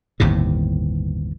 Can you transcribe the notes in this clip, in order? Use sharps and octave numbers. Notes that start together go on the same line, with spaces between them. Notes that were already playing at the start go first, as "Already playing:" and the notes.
G1 D#2 A2 C3